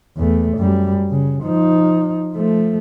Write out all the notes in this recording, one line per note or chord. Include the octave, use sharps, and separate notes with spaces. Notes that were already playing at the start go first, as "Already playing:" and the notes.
E2 A3
F#2 G3
C#3
F3 D#4
F3 A3